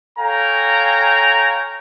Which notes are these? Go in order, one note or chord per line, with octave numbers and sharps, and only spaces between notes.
A4 C#5 F5 G5 G#5 A#5